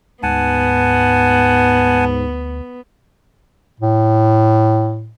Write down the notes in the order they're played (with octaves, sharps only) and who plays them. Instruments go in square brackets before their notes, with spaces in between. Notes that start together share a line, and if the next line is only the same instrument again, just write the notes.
[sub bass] D2 [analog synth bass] G#2 [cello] B3 [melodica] F#5 G#5 A5
[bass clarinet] A2